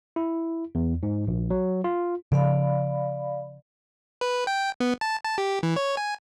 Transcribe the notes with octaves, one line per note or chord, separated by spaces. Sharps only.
E4
E2
G#2
A#1
F#3
F4
C#3 F3 D5 F5 B5
B4
G5
B3
A5
A5
G4
E3
C#5
G#5